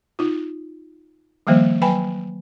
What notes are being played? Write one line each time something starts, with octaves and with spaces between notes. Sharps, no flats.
D#4 F4
D#3 F3 G3 A#3 C5
F#3 B4 G5 G#5 B5